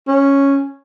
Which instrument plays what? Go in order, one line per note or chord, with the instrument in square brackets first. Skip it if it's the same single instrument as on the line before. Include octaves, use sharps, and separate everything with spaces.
[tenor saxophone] C#4